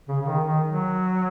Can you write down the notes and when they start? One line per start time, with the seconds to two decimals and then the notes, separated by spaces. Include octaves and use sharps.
0.08 C#3
0.21 C#3
0.27 D#3
0.46 D#3
0.66 F#3